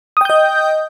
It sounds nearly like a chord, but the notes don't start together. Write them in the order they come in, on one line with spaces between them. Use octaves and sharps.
D#6 G5 G6 D#5